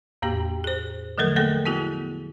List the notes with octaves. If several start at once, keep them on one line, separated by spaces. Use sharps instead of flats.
E2 A2 A#3 G4
G#4 C5
D3 F3 F#3 A3 A4 A#4
A3 A#3 G#4 A4
B3 E4 F#4 G#4